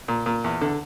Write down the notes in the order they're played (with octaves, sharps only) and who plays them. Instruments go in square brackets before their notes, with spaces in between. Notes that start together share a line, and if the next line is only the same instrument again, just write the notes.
[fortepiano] A#2
A#2
E2
D3